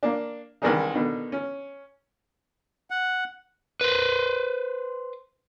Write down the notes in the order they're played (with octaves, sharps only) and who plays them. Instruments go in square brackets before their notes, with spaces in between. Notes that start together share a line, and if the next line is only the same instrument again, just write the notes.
[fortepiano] A#3 D4
C2 D#3 E3 G#3 D4 D#4
B2 D3 D#3
C#4
[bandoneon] F#5
[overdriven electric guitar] B4 C5